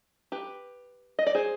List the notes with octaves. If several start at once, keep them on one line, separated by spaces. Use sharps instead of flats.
G4 B4
D#5
D5
G#4 C5